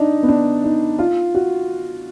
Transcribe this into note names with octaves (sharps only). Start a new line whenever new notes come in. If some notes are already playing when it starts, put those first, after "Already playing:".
Already playing: D4 D#4
B3
D4
D#4
F4
F#4